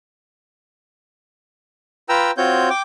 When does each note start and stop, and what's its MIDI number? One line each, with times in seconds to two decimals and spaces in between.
2.09 2.31 65
2.09 2.31 71
2.09 2.31 79
2.09 2.31 82
2.09 2.31 88
2.37 2.69 60
2.37 2.69 65
2.37 2.69 66
2.37 2.69 73
2.37 2.69 91
2.70 2.82 79
2.70 2.82 86